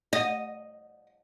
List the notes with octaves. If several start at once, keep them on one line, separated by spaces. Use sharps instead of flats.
D#5